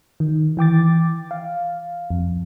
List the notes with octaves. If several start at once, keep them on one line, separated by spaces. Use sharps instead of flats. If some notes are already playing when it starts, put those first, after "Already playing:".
D#3
E3 G5 D6 A6
F5
F2